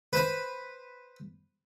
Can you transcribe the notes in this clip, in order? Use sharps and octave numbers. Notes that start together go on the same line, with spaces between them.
B4 C5 B5